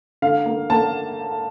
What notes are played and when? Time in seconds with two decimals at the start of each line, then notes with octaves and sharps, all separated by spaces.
0.22 D3 F5
0.46 A#3
0.70 A#3 A5